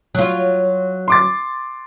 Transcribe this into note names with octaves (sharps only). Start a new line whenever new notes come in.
F#3 F4
C6 D6 A6